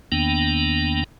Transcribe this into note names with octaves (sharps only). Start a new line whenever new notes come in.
E2 D#3 A#3 B3 D4 G5